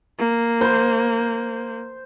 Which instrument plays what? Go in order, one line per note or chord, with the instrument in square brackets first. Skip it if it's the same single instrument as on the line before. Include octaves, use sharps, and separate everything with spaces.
[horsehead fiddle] A#3
[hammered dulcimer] C5